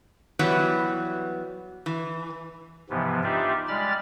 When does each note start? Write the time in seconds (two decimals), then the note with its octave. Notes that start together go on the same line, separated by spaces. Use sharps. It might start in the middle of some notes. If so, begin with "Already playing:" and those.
0.39 E3 F#3 G3 B3
1.86 E3
2.90 G#2 C3 E3 F3 B3
3.23 D4 D#4 F4 G4 D5 E5
3.68 G3 G#3 D5 B5 F6 A6